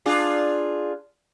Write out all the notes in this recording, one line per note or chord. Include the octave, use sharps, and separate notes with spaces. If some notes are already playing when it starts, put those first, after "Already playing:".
D4 F4 G#4